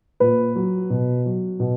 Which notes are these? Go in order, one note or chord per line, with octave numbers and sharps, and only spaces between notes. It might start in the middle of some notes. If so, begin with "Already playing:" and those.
A#2 B4
F#3
B2
F#3
B2